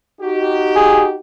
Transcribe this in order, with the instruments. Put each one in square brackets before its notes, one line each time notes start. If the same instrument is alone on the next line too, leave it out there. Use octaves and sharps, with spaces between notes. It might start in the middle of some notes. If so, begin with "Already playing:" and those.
[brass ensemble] D#4 F#4 G4
[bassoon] G#4